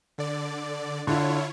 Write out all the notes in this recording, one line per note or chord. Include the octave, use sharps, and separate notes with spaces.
D3 D5
D3 E4 F4 C#5